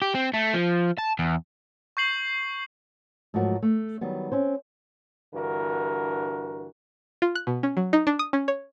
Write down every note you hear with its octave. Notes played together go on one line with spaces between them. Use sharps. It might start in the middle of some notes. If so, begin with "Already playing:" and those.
G4
C4
A3
F3
A5
E2
C#6 G6 C7 F#7
G#2 F3 F#3 A3 F#4 A#4
A3
D#3 F#3 G3 B3
C4 C#4 C5
G2 D3 E3 F#4 A#4
F4
F#6
B2
C#4
F#3
D#4
D4
D#6
C#4
C#5